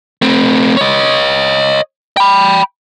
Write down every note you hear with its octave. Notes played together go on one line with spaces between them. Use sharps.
A3 C4
C#5 D#5
G5 B5